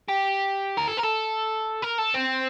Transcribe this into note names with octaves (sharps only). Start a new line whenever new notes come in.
G4
A#4
A4
A#4
A4
A#4
A4
C4